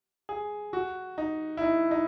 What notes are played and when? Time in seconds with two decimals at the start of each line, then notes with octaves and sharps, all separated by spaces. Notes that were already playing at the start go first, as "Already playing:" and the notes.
0.29 G#4
0.73 F#4
1.18 D#4
1.57 E4
1.61 D#4
1.91 D#4